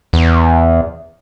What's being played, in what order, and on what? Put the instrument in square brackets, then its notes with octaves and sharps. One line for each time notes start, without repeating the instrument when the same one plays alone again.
[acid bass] E2